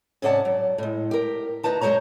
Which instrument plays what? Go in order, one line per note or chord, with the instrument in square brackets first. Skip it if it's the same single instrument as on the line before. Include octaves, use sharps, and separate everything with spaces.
[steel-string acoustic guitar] G#2 C3 C#4 D5 F#5 A5
F#3
A2 G#3
G4 A#4
D2 D#4 B4 A5 A#5
F#2 G#3 A4 C5 C#5 A#5